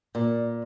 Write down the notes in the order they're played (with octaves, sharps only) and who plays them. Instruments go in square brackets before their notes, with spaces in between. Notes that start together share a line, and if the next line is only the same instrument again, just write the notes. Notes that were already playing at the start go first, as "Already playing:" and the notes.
[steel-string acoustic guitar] A#2